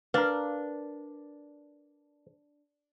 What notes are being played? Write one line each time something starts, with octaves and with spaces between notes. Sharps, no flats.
D4 A#4 B4 F5